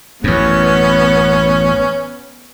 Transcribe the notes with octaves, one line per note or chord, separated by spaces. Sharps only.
A1 F#2 B3 C#4